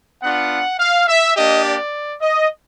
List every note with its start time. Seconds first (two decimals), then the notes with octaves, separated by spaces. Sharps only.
0.22 B3 D4 F4 F#5
0.79 F5
1.07 E5
1.35 A#3 D4 G4 D#5
1.64 D5
2.22 D#5